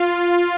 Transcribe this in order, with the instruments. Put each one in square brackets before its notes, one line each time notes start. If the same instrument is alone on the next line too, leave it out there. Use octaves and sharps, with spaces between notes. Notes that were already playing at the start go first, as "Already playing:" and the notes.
Already playing: [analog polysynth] F4